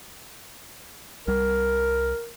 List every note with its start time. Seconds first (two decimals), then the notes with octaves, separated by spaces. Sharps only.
1.27 C2 G3 A#4